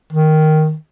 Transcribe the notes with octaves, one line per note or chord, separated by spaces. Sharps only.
D#3